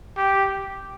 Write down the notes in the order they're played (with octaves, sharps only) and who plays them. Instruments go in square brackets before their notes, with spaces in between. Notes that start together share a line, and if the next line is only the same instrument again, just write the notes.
[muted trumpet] G4